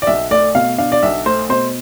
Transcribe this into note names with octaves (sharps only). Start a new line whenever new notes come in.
D5
B1 E5
A3 D5
B2 F5
D4 F5
D5
B1 E5
A3 C5
B2 C5